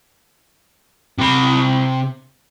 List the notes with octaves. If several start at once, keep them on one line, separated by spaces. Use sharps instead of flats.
C3 B5